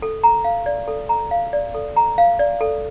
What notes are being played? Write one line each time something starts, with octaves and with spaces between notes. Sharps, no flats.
A4
A#5
F5
D5
A4
A#5
F5
D5
A4
A#5
F5
D5
A4